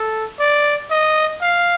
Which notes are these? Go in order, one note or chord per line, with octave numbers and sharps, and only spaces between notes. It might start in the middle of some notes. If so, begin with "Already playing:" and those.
Already playing: A4
D5
D#5
F5